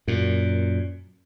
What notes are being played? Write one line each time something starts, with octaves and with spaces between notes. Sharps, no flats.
F#2 A#2